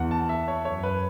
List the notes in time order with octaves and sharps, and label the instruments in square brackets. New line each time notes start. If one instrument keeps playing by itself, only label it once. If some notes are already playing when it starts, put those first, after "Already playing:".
Already playing: [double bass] E2 [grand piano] F#5
[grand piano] A5
E5
C#5
[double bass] F#2 [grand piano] C#5
[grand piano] B4